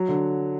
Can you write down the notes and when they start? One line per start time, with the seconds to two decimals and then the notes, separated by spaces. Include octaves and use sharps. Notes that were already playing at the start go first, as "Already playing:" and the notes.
Already playing: F#3
0.09 D3